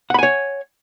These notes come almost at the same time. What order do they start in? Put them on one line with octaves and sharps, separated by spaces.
F#5 B5 G#5 C#5